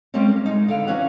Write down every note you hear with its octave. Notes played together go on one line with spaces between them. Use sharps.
G3 G#3 A#3 C4 C#4
A#4
G#3 D#4
D3 B3 F5
E2 E3 C#4 F5 F#5